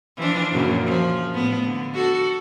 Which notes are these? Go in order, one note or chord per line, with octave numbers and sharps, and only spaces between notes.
E3 F3 D4
F#2 A#2 C#3
F3
A2 B3
D3
F#4 A4